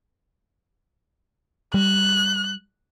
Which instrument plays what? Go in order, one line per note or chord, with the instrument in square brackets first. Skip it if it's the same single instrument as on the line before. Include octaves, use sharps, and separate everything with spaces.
[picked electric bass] G3 [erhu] F#6